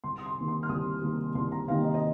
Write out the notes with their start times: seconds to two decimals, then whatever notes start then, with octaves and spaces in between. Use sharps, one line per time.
0.04 C2 C6
0.18 D#6
0.26 C6
0.37 C3 D#3 A#3
0.48 C6
0.63 F6
0.69 C2 D#6
1.02 C3 D#3 A#3
1.35 C2 C6
1.52 A#5
1.67 C3 D#3 A#3 F5
1.84 D#5
1.94 D#5